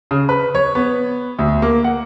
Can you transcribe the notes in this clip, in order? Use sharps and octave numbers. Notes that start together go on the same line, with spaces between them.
C#3
B4
C#5
B3
D2
A#3
F#5